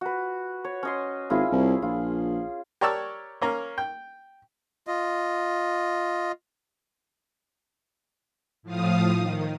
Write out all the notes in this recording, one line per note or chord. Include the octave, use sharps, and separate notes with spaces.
F#4 B4
C#5
C#4 D#5 C6
G#1 E4 F4 G#4
C2
A#1 F4
G4 A#4 C#5 D5 A5 E6
A#3 C#4 A#4
G5
F4 D#5
A2 F3 F5 D#6
D#3